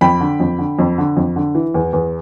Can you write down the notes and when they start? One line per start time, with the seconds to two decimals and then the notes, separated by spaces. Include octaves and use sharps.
0.01 F2 G5 B5
0.21 D3
0.40 F2
0.59 D3
0.79 F2
0.98 D3
1.17 F2
1.36 D3
1.55 E3
1.74 E2
1.93 E2